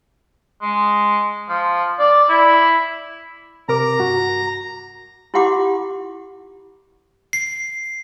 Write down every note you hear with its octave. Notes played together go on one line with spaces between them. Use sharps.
G#3
F3
D5
E4
C3 A#4 A#5 D6
G2 F#4
E4 F4 G4 F#5 C6 D6
C7